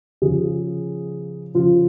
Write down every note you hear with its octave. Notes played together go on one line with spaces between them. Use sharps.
C#3 F3 G#4
C#3 F3 F4